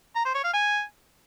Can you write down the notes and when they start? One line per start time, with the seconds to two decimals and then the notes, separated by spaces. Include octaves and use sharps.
0.16 A#5
0.25 C5
0.34 C#5
0.44 F5
0.53 G#5